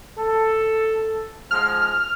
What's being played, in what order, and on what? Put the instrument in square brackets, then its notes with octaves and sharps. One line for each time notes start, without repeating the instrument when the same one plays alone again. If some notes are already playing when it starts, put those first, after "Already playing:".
[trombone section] A4
[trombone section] G#2 F3 G#3 [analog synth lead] F6